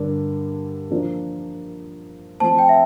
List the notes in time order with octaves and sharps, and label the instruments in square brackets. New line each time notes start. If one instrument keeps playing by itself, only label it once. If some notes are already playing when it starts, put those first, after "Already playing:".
Already playing: [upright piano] G2 D3 D4 [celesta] A#4
[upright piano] F3 A#3 D4 F4
[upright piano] F3 A3 C4 [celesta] A5
[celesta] G5
E5